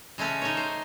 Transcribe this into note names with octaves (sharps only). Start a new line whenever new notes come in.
C#3 G#3 A3 C#4
D#4 A4 C#5
C5